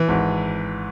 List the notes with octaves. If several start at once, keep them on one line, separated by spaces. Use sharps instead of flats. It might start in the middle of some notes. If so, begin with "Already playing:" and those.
Already playing: E3
G#1